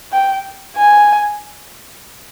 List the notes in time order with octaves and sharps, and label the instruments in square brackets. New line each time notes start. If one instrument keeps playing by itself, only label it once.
[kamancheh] G5
G#5